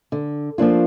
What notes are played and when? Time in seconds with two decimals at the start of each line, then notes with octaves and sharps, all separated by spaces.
0.12 D3
0.58 F3 A#3 D4 F4